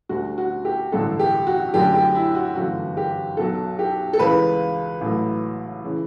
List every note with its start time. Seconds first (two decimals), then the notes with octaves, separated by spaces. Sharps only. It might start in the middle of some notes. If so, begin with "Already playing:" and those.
0.09 D2 D3 G3 F#4
0.38 F#4
0.65 G4
0.92 A1 G2 D3 F#3 A3 A4
1.19 G4
1.47 F#4
1.74 F#2 D3 F#3 A3 G4
1.94 G4
2.15 E4
2.35 F#4
2.55 G1 F#2 E3 A3 F#4
2.97 G4
3.37 B1 B2 F#3 A4
3.79 G4
4.13 A4
4.19 C#2 C#3 E3 B4
5.01 A1 A2 F#3 A3
5.84 C#3 E3